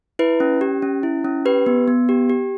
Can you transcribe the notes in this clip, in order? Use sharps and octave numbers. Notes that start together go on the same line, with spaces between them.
E4 B4
C#4
G4
C#4
E4
C#4
G4 B4
B3
B3
G4
G4